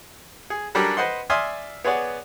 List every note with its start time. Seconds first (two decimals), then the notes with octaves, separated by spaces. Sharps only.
0.50 G#4
0.75 F#3 G3 C#4 D4 A4 A#4
0.97 B4 C5 D#5 F#5 C6
1.30 D5 E5 G#5 C6 D#6 F6
1.85 B3 G#4 C#5 D5 F#5